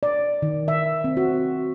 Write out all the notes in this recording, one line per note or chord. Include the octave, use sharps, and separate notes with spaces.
D5
D#3
E5
C4
F#4